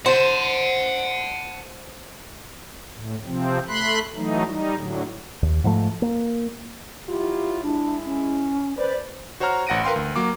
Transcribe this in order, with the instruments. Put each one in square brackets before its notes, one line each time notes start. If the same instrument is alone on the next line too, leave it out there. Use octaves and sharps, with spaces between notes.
[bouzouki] C5 [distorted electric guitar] F#5 A5
[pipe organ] A2
C3 F3 C4
A3 B5 C6 F#6
E3 F#3 A3 D#4
G3 D#4
A2 D3 F#3
[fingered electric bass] D#2
G#2 F3 A3
A#3
[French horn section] F#3 E4 F4 [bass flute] G4
[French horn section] G#3 E4 [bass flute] D4
[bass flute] C#4
[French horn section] B4 D5 [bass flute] C5
[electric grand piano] F#4 C5 C#5 F#5 A#5 F6
A1 F#5 A#6 D7 D#7
A#4 B4 F5 G5 C6
D2
F#3 A#3 D6